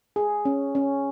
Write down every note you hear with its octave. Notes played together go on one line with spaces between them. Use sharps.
G#4
C#4
C#4